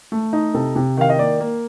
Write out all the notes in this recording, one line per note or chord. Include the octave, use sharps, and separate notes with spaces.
A3
D#4
C3 A4
C3
D#3 F5
D#5
A#3 D5
A#3